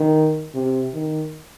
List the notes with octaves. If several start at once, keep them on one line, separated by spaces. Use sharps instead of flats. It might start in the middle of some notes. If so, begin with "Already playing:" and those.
Already playing: D#3
C3
D#3